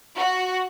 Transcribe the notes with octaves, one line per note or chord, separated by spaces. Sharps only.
F#4